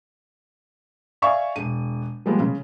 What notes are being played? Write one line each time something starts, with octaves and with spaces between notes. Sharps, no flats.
D5 E5 F5 G#5 C#6
E1 D#7
F3 G3 G#3 A#3 B3
C#3